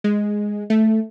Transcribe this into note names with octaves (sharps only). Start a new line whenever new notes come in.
G#3
A3